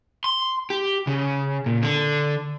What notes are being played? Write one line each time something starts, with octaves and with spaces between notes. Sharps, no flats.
C6
G4
C#3
A#2
D3